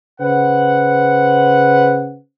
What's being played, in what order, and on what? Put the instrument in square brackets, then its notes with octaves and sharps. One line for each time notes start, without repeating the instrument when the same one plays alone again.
[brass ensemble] C#3 B4 C5 F#5